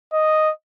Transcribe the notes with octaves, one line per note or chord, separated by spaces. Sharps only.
D#5